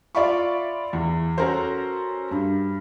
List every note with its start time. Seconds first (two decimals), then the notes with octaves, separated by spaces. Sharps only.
0.15 F4 D5 E5 F5 B5 C#6
0.93 E2
1.38 C#4 F#4 A4 A#4 C5
2.31 G2